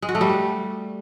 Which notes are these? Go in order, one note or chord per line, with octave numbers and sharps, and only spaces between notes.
G#3
F#4
A3
G3